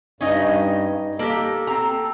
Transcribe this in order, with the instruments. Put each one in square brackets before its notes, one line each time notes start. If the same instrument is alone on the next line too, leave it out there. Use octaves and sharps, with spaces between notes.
[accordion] G2 [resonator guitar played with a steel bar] C#4 D#4 D#5
[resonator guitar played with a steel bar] A#3 G4 [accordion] A4
[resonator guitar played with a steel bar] C4 A#5